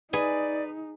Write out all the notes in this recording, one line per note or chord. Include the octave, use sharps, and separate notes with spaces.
D#4 G#4 B4 D5